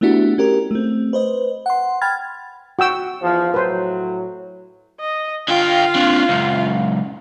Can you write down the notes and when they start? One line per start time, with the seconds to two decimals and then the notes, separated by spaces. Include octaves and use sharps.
0.01 A3 B3 D4 E4 F#4 G4
0.38 C#4 G4 A#4
0.71 A3 C4
1.13 B4 C5 D#5
1.66 F#5 C6
2.01 G5 B5 F6 G#6 A6
2.79 F#4 G5 E6
3.21 E2 F3
3.54 A2 F#3 B4 C5
5.00 D#5
5.48 D3 F4 F5 G5
5.95 C4 D4
6.29 C#2 F#2